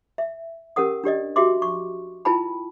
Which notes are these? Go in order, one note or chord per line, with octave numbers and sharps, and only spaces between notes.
E5
C#4 G4 A#4 F#5 D#6
D4 G4 D5 D#5
F#4 G4 E5 C6 D6
C#6
E4 F4 B4 G5 A5 B5